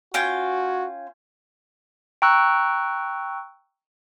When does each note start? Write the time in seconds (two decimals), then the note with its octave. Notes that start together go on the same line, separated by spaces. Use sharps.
0.14 C#4 F4 F#4 G5
2.22 G5 A#5 C#6 E6 F#6